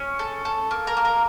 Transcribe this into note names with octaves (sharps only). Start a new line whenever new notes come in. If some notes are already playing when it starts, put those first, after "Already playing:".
Already playing: C#4 C#5
A4
A4
A#3
A#4
A#3
A#4